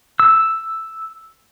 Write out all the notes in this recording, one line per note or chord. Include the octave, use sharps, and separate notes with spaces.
E6